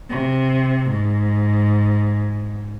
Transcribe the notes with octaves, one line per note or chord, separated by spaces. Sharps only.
C3
G#2